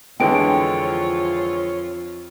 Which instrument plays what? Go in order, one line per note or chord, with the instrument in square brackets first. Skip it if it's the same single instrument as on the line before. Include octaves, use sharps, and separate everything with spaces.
[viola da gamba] F2 F4 [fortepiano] D3 E3 G#3 [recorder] C#5 [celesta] G5 D7